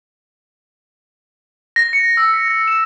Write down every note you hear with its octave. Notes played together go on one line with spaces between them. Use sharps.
A#6
C#7
E6
B6
A#6
E7